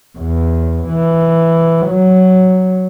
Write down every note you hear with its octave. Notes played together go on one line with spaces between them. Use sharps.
E2
E3
F#3